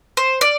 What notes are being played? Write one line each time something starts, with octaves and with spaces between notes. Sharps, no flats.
C5
D5